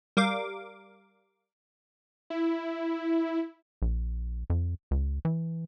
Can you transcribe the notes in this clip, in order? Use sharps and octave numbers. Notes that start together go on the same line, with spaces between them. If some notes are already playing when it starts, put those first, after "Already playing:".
G3 A#4 F5 D6
E4
A#1
F2
C#2
E3